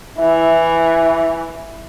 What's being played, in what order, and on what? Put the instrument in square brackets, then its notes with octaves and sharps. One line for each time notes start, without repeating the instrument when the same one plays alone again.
[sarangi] E3 [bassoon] E4